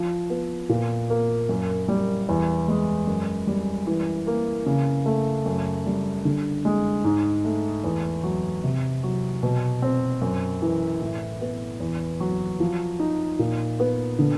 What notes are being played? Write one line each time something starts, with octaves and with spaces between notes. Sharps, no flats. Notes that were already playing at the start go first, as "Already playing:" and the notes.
Already playing: F3
B3
A#2
A#3
F#2
G3
E2
G#3
F#2
G3
E3
A#3
C#3
A3
F#2
G3
D3
G#3
G#2
A3
E2
F#3
C3
F#3
B2
C4
F#2
E3
A2
B3
E2
F#3
F3
D#4
A#2
B3
D3